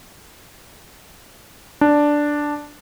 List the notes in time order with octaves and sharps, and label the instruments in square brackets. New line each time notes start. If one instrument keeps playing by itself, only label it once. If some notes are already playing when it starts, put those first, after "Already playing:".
[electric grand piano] D4